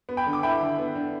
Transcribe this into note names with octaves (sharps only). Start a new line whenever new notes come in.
B3
G5 B5
D3
D6
E4 G5 B5
D3
B3
D3